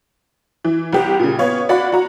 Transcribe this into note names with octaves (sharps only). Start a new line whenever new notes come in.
E3
C2 G4
A#2 C#3
B3 C#5 F5
F#4 D5 F5 F#5 B5
F#4 A#5